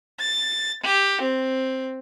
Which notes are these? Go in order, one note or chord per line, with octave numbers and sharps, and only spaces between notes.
A6
G4
C4